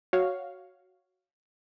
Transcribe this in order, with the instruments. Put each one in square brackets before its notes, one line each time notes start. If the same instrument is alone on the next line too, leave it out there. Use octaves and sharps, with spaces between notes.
[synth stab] F#4 C#5 F5